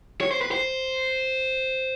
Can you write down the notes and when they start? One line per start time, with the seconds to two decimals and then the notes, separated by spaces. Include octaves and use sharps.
0.21 C#5
0.31 C5
0.41 B4
0.51 C5